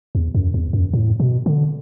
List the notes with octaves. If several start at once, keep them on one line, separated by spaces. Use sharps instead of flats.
E2
F#2
E2
F#2
A2
B2
D3